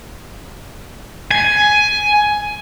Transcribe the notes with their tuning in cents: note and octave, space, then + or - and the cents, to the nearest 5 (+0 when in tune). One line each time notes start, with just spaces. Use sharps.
G#5 +10